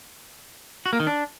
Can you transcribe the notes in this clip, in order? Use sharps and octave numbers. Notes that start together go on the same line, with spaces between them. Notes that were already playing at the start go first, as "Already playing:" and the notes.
F#4
A#3
D#3
D4